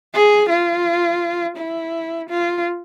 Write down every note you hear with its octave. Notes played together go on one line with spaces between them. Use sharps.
G#4
F4
E4
F4